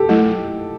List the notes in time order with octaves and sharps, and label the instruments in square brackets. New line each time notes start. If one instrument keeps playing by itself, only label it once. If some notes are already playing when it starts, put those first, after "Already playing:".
Already playing: [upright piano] G4 A4
[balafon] F#3 A3 E4